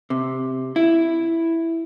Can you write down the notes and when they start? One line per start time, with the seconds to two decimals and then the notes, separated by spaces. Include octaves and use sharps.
0.10 C3
0.76 E4